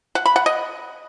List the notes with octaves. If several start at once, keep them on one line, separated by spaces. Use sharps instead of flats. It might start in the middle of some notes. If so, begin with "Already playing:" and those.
F#5
B5
F#5
D#5